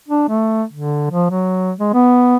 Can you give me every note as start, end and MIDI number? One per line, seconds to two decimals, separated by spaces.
0.08 0.25 62
0.29 0.63 57
0.72 1.08 50
1.10 1.30 53
1.30 1.72 54
1.79 1.92 56
1.93 2.37 59